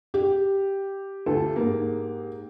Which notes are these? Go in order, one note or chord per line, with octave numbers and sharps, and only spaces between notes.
G4
D2 F4 A4
G#2 A#3